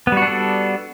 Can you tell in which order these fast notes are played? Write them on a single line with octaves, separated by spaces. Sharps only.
B3 G3 F#4 D4 A4